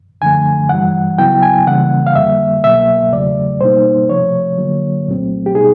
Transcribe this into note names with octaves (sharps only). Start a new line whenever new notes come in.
F#2 D3 F3 A3 G#5
G2 E3 G3 F#5
C#2 C#3 F#3 B3 E4 G5
G#5
C#3 E3 G3 A#3 F#5
F5
F2 D3 G3 A#3 E5
C2 B2 F#3 A#3 E5
E2 C#3 F#3 A3 D5
B2 G3 A#3 D#4 C5
C3 F3 A3 C#5
D3 F#3 A#3
C2 A#2 F#3 A3 C4
G4
B2 G3 B3 D#4 G#4